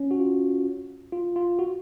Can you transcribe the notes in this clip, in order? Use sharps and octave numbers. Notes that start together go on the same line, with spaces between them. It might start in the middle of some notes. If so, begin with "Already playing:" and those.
Already playing: C#4
F#4
F4
F4
F4
F#4